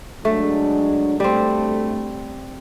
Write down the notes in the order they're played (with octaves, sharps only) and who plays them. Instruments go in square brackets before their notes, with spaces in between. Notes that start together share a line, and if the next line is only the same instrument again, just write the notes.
[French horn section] F#3 G#3 D4 [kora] A3
[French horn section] D2 A3 [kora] G3 C4